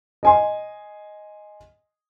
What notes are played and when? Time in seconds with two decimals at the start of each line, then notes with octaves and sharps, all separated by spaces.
0.23 D#5 G#5 C6